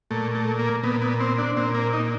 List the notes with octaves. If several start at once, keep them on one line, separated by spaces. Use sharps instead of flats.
A#2 A3
A3
A#3
A#2 B3
B3
C4
D4
A#2 C4
A#3
D#4